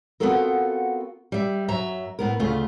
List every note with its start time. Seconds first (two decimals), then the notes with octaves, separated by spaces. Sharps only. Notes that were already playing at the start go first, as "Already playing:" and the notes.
0.20 B3 C4 F4 F#4 A4 A#4
1.32 G3 E5
1.68 F#2 F#3 E5 A#5
2.19 A2 B3 A#4
2.40 D2 C#3 A3 F4